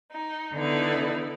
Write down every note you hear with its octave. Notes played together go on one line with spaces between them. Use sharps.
D#4
D3 B3 D#4 E4